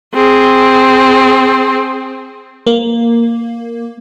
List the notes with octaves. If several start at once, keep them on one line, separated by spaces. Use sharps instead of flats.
C4 G#4
A#3